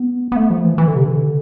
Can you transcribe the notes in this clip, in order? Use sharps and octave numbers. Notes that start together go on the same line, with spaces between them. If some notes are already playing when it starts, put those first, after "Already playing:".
Already playing: B3
B3
A3
F3
E3
E3
D3
C3
D3